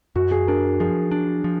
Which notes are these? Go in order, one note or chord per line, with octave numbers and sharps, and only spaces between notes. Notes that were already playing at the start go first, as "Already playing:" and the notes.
F#2 F#4
G#4
D4 A#4
F3 G#4
D4
F3